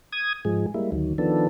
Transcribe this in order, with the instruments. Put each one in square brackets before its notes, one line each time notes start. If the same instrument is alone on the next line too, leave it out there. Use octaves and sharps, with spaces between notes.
[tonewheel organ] D#6 G#6
G#2 F3 G#3 G#4
G3 G#3 A#3 E4
D2 D#3 F#3
D#3 F3 B3 D4 A4